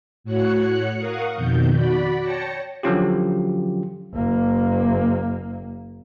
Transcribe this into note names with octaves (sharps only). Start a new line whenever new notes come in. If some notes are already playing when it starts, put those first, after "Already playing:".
A2 F#4 C#5 F#6 C#7
A#4 F5 F#5 C#6 D#6
F2 B2 D#3 G6
F#4 D5 B5
C#5 G5 A5 A#6 C#7
D3 F3 F#3 C#4 F4 G4
F#1 A#3